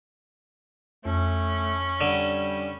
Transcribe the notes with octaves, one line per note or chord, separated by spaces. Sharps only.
F2 A3 C#4
D3 G3